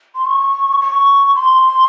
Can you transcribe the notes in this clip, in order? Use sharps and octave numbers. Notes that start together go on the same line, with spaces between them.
C6
C#6
C#6
C6